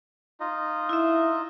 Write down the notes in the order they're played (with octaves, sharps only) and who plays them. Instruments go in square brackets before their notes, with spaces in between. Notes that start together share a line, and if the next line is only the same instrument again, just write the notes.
[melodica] D#4 F4 D#5
[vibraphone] E4 E5